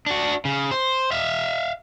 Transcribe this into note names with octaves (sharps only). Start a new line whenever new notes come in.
D4 F#4
C#3
C5
E5 F5